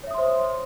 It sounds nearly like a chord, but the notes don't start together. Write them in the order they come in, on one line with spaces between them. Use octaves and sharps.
C#5 E5 D#6 C6 C5